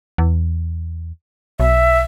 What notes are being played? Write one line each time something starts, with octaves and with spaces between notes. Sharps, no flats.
E2
B1 E5